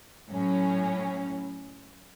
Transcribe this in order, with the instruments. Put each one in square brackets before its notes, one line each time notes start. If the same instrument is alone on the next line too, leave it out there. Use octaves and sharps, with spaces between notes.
[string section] A2 F#3 C#4